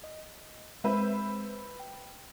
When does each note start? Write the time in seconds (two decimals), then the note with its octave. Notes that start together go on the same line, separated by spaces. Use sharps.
0.04 D#5
0.84 G#3 C4 B4 C5 E5
1.79 G5